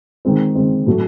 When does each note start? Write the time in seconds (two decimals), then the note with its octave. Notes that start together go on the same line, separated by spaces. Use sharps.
0.25 D#3 G#3 C4
0.55 D#3 G#3 C4
0.87 A2 F#3 A3